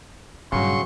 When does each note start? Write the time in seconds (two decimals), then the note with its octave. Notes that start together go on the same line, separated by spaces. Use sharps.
0.52 G2 A#2 C#3 F#3 C6 C#6